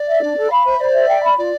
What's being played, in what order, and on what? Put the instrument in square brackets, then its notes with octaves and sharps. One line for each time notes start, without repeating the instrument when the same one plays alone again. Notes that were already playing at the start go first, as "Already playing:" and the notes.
Already playing: [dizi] D5
[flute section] E5
D4
A4
[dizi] F5 [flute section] B5
[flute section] C5 [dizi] E5
[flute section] C5 [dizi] D5
[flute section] E5
G5
B5
[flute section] F4 [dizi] D5